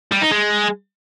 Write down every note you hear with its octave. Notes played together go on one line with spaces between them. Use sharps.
G3
D#4
G#3